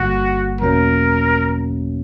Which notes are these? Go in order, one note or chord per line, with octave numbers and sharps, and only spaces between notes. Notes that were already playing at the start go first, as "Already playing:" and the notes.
Already playing: G1 G2 D3 G3 A#3 F#4
E2 B2 F#3 A#3 C#4 A#4